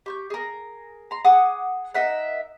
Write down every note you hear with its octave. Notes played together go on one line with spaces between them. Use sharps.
G4 C#6 G6
G#4 A#4
A#5 C6
G#4 F#5 D6 D#6
D#4 A#4 E5 F#5